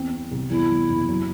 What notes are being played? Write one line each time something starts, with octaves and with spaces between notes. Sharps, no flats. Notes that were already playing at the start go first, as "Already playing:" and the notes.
Already playing: E2 C4
C4
C2
E2 E4
E2
F#1
F#3